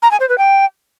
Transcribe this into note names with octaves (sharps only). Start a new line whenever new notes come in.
A#5
G#5
C5
B4
G5